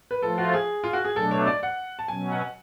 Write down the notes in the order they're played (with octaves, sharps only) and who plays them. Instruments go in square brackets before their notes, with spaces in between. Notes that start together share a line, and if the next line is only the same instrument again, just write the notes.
[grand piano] B4
[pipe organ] F3 A3 F4 [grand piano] A4
[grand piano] F#4
G#4
F4
F#4
G#4
[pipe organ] B2 F#3 A3 D4 [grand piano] A4
[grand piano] C#5
D5
F#5
A5
[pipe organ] B2 F#3 C#4 [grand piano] G#5
[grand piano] F#5